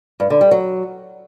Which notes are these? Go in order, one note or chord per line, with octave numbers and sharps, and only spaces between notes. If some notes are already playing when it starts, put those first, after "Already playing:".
G2
D3
G3
F#3